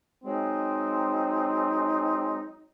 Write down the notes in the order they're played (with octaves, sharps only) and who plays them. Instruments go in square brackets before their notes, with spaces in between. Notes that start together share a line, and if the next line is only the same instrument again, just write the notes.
[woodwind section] F#3 G#3 C4 [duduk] D#4